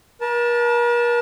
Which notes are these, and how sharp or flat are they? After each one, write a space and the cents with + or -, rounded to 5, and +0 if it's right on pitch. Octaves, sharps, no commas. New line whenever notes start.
A#4 +45 A5 +0